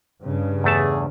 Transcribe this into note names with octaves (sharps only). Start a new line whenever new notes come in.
G2 C#3
E2 A3 G#4 A5